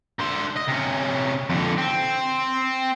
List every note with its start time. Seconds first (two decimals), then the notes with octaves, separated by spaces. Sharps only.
0.20 D3 C5
0.57 D#5
0.68 C3 C#4
1.50 F2 D3
1.78 C4